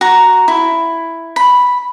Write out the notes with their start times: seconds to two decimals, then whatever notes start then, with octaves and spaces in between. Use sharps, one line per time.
0.01 F#4 A#5
0.48 E4
1.36 B5